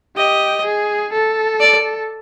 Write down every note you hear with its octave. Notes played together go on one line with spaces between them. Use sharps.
G4 D#5
G#4
A4
D5